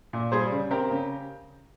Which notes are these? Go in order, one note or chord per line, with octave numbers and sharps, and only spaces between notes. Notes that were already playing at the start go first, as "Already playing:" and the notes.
A#2
G3 G#4 C5
C#3
C4 G4 A#4
C#3